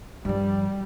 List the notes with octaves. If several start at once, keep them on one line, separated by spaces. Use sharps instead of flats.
G2 F3 G3